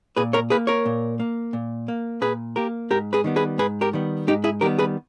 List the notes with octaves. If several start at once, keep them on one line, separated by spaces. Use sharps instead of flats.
A#2 G#4 B4
A#4 C#5
A#3 G#4 B4
A#4 C#5
A#2
A#3
A#2
A#3
A#2 G#4 B4
A#3 G4 A#4
G#2 G4 A#4
G#4 B4
D#3 G3 B3
G#4 B4
G#2 G#4 B4
G4 A#4
D#3 G3 B3
G#2 D#4 G4
E4 G#4
D#3 G3 B3 G4 A#4
G#4 B4